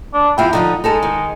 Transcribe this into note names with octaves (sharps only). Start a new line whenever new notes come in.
D4
E2 E4 F4 G5
D3 E3 F3 D#4
G#3 D#4 A4 A5
D#3